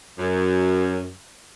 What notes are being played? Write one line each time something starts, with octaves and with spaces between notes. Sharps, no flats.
F#2